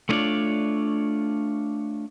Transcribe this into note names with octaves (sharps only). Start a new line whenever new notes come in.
A3 B3 D4 F4 C#5 D5